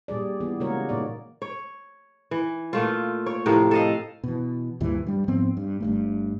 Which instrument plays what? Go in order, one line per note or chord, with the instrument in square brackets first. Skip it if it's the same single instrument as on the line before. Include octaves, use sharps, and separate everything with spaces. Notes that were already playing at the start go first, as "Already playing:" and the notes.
[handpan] A#2 G3 G#4 D5
E3 B3 G#4
C#3 G#3 A#3 F#4 A#4 C#5
A#2 D#4 D5
[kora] C#5
E3
A#2 A3 F4
C#5
A2 C3 F3 A#4
A4 D#5 F5
[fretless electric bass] B2 E3
D2 G2 A#2 E3
G2 G3
G#2 F3 B3 C4
G2
G1 G2 A3